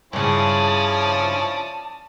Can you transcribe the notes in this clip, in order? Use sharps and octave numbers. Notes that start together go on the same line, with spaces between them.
G2 C#3 F3 C#4 E4 D5 A5 D#6